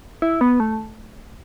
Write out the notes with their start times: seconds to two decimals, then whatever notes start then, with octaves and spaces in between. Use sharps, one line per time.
0.22 E4
0.41 B3
0.60 A3